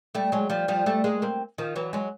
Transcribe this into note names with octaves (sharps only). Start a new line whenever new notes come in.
G3 A3
F#3 G#3
F3 G3
F3 G3
G3 A3
G#3 A#3
A#3 C4
D#3 F3
E3 F#3
F#3 G#3